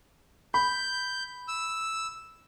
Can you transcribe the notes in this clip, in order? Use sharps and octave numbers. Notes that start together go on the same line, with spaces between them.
B5 G6
E6